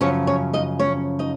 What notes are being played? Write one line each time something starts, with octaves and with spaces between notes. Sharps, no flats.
F#2 C#3 F3 C#4 C#5
C#4 C#5
D#4 D#5
C#4 C#5
D#4 D#5